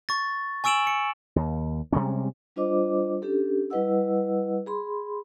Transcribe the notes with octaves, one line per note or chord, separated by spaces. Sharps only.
C#6 A6
G#5 C#6 E6 D7 E7 F#7
C#7
D#2
C3 G3 G#3 C#4
G3 D4 F4 C5 D#5 D6
C#4 D4 G4 A4
G3 E4 B4 D#5 F#5 E6
G#4 B5 C6